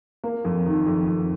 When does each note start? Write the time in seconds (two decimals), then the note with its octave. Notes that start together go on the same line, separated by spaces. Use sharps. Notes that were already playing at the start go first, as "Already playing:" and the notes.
0.24 A#3
0.45 F2
0.66 D#3
0.87 F2
1.08 F2